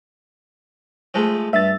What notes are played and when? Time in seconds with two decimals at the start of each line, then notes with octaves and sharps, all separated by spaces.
1.14 F3 G#3 A3
1.53 G2 E5 A6